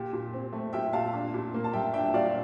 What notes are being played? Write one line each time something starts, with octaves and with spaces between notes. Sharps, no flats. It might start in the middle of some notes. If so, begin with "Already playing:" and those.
Already playing: A#2 G4
A#2
C4
A3
A#2 E5 G5
A#2 F5 A5
D4
A#2
A#3
A5
G3 E5 G5
D4 E5 G5
E5
A#2 D5 F5